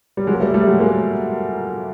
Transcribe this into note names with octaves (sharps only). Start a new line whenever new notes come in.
G3
F#3 G#3
A#3
G3 A3
G3 A3
F#3 G#3
G#3 A#3